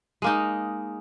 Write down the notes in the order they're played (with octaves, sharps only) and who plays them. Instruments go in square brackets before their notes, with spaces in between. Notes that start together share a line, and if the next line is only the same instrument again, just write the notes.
[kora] G#3 A#3 D#4